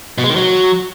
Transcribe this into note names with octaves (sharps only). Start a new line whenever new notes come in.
B2
G#3
D#3
F#3